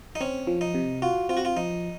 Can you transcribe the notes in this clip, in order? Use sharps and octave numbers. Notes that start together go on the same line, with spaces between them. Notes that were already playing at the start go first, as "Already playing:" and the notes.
D#4
C4 C#4
F3
D#4
C3
F4 F#4
C4 F4
F#4
F4
F3 D#4